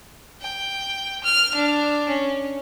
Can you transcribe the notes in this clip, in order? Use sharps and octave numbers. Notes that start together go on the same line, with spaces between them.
G5
F6
D4
C#4